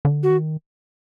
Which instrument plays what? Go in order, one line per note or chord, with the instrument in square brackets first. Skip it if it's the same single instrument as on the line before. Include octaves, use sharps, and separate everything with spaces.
[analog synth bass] D3
[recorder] F#4
[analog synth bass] D#3